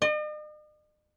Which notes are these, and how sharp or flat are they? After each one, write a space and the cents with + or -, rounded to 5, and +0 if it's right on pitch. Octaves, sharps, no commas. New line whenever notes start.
D#5 -45